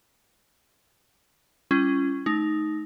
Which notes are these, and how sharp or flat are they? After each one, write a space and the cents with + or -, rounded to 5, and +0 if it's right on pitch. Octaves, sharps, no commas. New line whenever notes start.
G3 +15 C#4 +0 F4 -40
A3 -35 D#4 +0